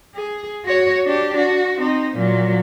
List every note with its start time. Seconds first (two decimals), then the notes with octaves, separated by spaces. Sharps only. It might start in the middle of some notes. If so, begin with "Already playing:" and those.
0.15 G#4
0.65 F#4 C#5
1.05 D4 G4
1.37 F#4
1.77 C4 D#4
2.17 A#2 F#3